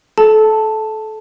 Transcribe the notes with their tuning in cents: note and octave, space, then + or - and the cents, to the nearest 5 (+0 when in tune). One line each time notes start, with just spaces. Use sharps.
A4 -25 A5 +0